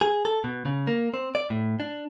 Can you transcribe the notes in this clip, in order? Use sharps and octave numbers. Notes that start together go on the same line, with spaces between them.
G#4
A4
B2
C#3
A#3
C4
D5
A2
D4